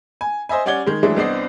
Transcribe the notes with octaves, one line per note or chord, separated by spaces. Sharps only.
G#5
C5 D#5 E5 G#5
G3 C#4 D5 F#5 G#6 G7
D#3 G#3
E3 F#3 G#3 A3 D4
C2 B3 C4 D4 D#5 C7